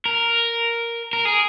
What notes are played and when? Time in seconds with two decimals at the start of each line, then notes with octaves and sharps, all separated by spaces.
0.05 A#4
1.13 A#4
1.25 G#4